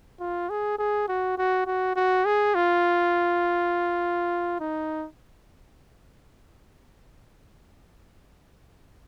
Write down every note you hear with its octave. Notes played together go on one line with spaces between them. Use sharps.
F4
G#4
G#4
F#4
F#4
F#4
F#4
G#4
F4
D#4